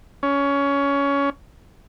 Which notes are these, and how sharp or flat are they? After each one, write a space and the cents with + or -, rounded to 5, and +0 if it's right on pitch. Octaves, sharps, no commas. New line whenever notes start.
C#4 +20